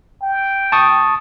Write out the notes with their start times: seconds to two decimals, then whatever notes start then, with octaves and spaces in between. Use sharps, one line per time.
0.22 G5
0.72 A5 C#6 D#6